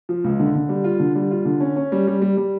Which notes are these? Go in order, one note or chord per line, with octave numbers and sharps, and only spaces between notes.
F3
C#2
D3
D3
G3
F4
D3
G3
F4
D3
C#4
C#4
G3
G3
G3
G3